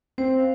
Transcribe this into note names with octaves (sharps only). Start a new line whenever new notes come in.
C4 C5
F5